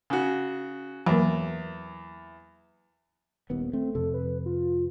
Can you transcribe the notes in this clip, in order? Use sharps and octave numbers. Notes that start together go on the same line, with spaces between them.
C#3 F#4
E2 F#3 A#3
D#1 D#2 B3
A3 C4
F2 C3 A4
B4
F4